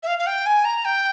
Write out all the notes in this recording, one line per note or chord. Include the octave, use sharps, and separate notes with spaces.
E5
F5
F5
G5
G#5
A#5
G5